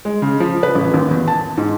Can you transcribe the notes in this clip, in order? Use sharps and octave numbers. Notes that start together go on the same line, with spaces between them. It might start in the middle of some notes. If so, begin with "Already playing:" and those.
G#3
C#3
F3
B4
A1
D#2
E2
A5
G#2